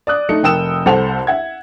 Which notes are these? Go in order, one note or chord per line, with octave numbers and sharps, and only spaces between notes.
D5 D#6 F#6
A3 D#4 C#7
F1 A#4 G5 D#6 E6 E7
C2 A4 C5 F#5 F7
E5 F#5 G#6